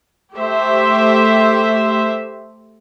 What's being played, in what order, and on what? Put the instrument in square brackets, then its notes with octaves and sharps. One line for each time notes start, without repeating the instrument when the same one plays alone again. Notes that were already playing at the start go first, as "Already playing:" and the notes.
[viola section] A3 G4 C5 E5